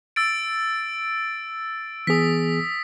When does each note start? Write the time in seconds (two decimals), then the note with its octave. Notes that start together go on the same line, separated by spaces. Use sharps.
0.16 E6 A6 D7
2.07 E3 B3 G#4 D#6 B6